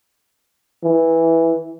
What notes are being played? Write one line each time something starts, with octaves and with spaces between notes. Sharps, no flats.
E3